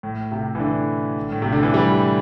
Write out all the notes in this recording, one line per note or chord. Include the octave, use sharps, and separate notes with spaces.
A2
C3
E3
D3
A2
C3
D3
E3
G3